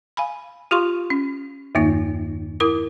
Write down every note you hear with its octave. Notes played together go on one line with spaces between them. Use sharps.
F5 G#5 B5
F4 G4 F5 C6 C#6
C#4
E2 G2 D#3 A#3 D#4
E4 A#4 D#6